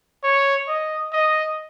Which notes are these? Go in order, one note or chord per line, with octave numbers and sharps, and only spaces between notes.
C#5
D#5
D#5